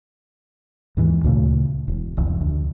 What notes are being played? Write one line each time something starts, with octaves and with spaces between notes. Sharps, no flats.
D#2 G#2 E3
D2 A#2 C#3 A3
E1
E1 C2 F2
D2